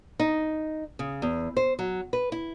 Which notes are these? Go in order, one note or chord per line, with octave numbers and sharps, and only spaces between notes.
D#4
C#3
E2
C5
F#3
B4
E4